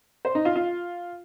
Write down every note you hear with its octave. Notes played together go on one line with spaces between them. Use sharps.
C5
D#4
F4
F4